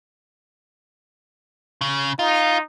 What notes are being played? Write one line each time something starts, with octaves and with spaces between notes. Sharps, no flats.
C#3
D#4 F4